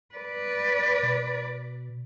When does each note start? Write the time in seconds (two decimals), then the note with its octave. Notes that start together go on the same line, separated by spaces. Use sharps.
0.15 B4 D5
1.03 B2